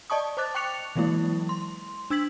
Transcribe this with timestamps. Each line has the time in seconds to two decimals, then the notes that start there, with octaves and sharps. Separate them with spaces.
0.10 D5 D#5 A5 C#6 D#6
0.37 C5 A5 D6 F#6 A6
0.55 G5 C#6 D6 F#6 C#7 F7
0.96 E3 F#3 G#3 A#3 E4
1.49 C6
2.10 D4 E6 G#6 B6 F#7